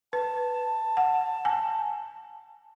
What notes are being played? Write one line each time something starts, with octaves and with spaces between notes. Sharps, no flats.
B4 A5
F#5
G#5